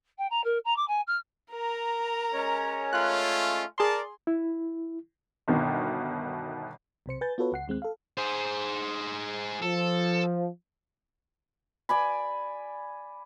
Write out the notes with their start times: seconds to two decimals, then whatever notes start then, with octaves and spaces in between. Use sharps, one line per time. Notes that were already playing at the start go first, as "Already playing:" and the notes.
0.18 G5
0.30 A#5
0.44 A#4
0.65 A#5
0.76 D6
0.87 G#5
1.07 F6
1.51 A#4 A#5
2.33 G#3 C#4 C#5
2.93 A3 F4 F#6
3.78 G#4 A#4 D5 A5 C6
4.27 E4
5.48 G1 B2 D#3
7.06 B1 C3 C5 C#7
7.21 B4 G#5 G6 A6
7.38 B3 F4 F#4 A4 B4 C#5
7.52 C#2 F#5 C7
7.68 D#2 G#3 C4 F#6
7.82 A4 F5
8.18 G#4 C5
9.62 F3 A4
11.89 D5 G#5 B5